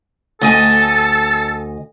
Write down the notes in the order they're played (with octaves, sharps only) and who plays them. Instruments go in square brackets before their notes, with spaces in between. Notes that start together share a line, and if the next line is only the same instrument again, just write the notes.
[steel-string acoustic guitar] D2 D#5 G#5 [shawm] A4